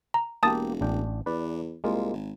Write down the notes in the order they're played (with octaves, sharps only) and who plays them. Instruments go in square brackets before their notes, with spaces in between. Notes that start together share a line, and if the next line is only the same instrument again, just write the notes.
[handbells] A#5
[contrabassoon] E1 [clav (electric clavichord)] A#3 G4 [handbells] A5 D#6 A6
[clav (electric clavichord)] A1 D4 G5
[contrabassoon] E2 [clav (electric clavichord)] B4 D5
[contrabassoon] C2 [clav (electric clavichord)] G#3 A#3 F4
[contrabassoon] G#1